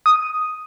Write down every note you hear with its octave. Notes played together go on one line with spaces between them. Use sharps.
D#6